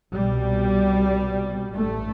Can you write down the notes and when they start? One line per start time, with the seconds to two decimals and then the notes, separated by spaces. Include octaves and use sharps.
0.12 C2 B2 G3
1.73 A1 G2 A3